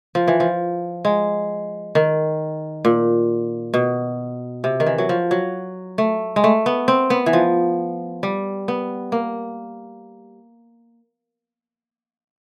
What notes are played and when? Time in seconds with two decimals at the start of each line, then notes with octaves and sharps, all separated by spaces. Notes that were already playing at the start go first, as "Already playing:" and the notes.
0.15 F3
0.28 E3
0.40 F3
1.05 G#3
1.95 D#3
2.85 A#2
3.74 B2
4.64 C3
4.80 D#3
4.86 E3
4.98 F#3
5.09 F3
5.31 F#3
5.98 A3
6.36 G#3
6.44 A3
6.66 B3
6.88 C4
7.10 B3
7.26 E3
7.33 F3
8.23 G3
8.68 B3
9.12 A#3